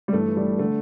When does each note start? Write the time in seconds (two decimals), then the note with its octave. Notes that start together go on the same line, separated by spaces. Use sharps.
0.08 G3
0.13 G1 G2 E3 A3
0.37 G3
0.59 D3 A3